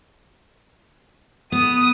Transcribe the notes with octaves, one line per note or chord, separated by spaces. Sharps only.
B3 D#6